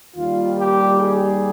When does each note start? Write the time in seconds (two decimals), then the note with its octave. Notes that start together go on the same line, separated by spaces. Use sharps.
0.15 D#2 D#3 G3 F4
0.58 G4
1.00 G#4